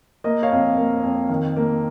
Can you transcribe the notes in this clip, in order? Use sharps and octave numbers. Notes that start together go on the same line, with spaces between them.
A#3 D#5
C#5 F5
F2
A#3
F2
D#3
A#3